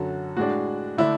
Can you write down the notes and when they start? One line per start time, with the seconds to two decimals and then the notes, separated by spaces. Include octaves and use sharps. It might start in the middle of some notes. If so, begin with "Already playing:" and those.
Already playing: F#2 D3 F#3 C#4 F#4 A4
0.37 A2 G#3 D4 F#4
0.98 D3 A3 D4 E4